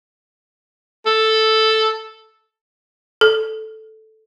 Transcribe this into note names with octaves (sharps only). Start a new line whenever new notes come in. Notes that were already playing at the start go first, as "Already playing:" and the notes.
A4
A4